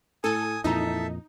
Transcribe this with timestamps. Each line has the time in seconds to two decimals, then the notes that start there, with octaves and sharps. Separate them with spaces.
0.24 A2 A4 G#5 D#6
0.64 F2 A#2 E3 D#4 A4 E5 A#5